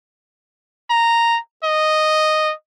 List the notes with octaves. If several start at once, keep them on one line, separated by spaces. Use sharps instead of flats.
A#5
D#5